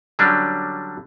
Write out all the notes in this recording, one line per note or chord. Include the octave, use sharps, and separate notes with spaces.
D3 F#3 G3 C#4 D4